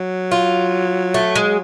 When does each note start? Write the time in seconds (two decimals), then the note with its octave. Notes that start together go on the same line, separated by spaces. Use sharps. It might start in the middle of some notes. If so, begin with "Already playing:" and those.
Already playing: F#3
0.32 F4
1.14 A3
1.35 G#3